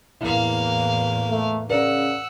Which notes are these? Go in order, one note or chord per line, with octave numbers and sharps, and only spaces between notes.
E2 A2 A#3 E4 F5
A3
C#3 A#4 D5 F#5 E6